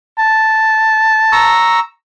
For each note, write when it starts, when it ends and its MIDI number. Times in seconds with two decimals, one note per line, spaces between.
0.18 1.60 81
1.32 1.80 82
1.32 1.80 85
1.32 1.80 88